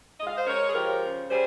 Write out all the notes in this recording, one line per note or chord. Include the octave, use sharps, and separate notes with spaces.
G#3 D#5
F5
C5 D#5
G#3 A#4 C#5
G#4
F3 G4 A#4
C#3
G3 G#4 C5